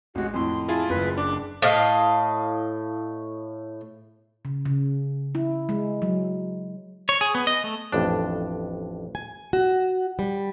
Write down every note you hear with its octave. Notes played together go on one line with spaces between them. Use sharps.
A1 G#3 F#4
F2 A2 C6
E4 F4 G#4 A5
F#1 B4
D4 D6
A2 D#5 F5
C#3
C#3
E4
G#3
F#3
C#5
G#4
B3
D#5
A3
A1 F2 D4
G#5
F#4
G3